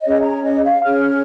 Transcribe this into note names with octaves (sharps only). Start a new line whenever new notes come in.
C#4 G#4 C#5 D#5
A#5
D#5
F5
C#4 G#4 C#5 F6